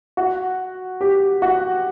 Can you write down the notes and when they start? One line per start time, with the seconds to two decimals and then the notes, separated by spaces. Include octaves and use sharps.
0.17 F#4
1.01 G4
1.42 F#4